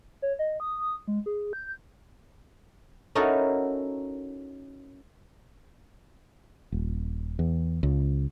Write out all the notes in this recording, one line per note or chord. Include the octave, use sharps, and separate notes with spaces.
C#5
D#5
D#6
G#3
G#4
G6
C#4 D#4 E4 F#4 A4 A#4
D#1
E2
C#2